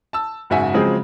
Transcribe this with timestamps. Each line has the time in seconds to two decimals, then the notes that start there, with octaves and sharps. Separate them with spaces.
0.13 A5 E6
0.50 F#1 G#2 F#4 E5 G#5
0.74 C#3 F3 F#3 G#3 C4 G#4